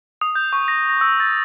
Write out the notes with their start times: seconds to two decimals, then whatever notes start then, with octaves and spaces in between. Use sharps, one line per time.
0.21 D#6
0.35 G6
0.53 C#6
0.68 A#6
0.89 A#6
1.01 E6
1.20 A6